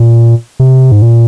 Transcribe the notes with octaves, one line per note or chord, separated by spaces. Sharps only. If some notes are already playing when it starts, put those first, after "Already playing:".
Already playing: A#2
C3
G#2
A#2